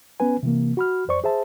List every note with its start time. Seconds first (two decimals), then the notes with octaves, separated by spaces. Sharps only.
0.20 B3 C#4 B4 G#5
0.43 C3 E3 A#3
0.77 F#4 B5 F6
1.08 F2 C5 D5 C#6
1.24 G#4 C5 E5 A5